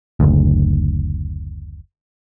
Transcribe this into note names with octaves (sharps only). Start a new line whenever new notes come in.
F#1 D2